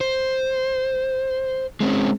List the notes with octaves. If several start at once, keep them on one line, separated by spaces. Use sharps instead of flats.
C5
G#3 C4 C#4